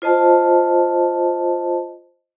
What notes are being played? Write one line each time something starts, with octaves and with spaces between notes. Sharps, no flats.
F4 C5 D#5 A5